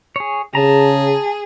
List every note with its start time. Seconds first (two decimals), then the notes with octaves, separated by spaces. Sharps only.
0.16 G#4 C#5
0.55 C#3 G#4 A5 A#5